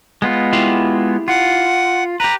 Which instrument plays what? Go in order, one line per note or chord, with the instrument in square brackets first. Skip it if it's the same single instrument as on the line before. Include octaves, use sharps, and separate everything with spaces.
[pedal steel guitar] G#3 B3 F4
[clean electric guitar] E4 G4 C6
[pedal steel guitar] F4 [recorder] F#5
[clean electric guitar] G4 B4 [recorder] A#5